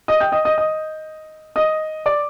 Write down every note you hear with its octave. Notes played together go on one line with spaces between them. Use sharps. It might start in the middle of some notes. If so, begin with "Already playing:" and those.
D#5 D#6
G5 G6
D#5 D#6
D#5 D#6
D#5 D#6
D#5 D#6
D5 D6